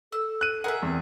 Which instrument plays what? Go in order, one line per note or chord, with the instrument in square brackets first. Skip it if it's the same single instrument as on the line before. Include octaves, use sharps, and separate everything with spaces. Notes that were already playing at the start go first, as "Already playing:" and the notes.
[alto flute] A4 [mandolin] E6
[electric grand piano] F#6 D#7
[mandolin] G#4 E5 [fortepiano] A#4 F#5
[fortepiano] E2 [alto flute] C4